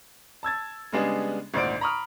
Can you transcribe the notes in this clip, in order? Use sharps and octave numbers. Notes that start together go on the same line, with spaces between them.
A5 E6 G#6 A6
C#3 G3 G#3 B3 D4 G#4
G#1 D2 A#2 C5 D5 D7
A#5 B5 C#6 D#6 F6